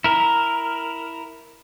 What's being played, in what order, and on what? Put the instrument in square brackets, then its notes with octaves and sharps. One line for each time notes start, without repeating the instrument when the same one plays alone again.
[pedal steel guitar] E4 A#4